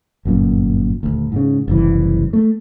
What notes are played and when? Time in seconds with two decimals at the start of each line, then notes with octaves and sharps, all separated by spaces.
0.25 G1 F#2 A#2
1.03 D#1 G#1 D2
1.32 G#2 C#3
1.68 F#1 C2 E3
2.33 A3